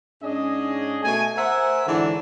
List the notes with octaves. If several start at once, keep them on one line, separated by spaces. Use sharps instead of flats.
G#2 C#4 D4 G#4 D#5
B2 A3 G#5
A#4 C5 E5 F#5 G#5
G#2 D3 E3 F#3 D4